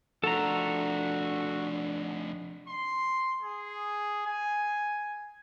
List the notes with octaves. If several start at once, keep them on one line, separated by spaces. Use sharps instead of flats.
F3 A3 D4 F#4 A4 A#5
C6
G#4
G#5